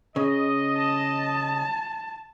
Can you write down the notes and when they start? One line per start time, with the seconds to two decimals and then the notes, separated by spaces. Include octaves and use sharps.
0.16 C#3 D#5
0.77 A5